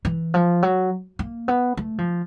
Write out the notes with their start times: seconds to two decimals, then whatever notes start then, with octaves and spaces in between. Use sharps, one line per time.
0.05 E3
0.34 F3
0.62 F#3
1.19 A#3
1.48 B3
1.77 A3
1.98 F3